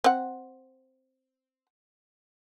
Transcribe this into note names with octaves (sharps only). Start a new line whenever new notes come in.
C4 F#5